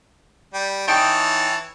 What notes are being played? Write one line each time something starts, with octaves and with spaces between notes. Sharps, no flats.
G3 G5
E3 D#4 C#5 G5 A5 G6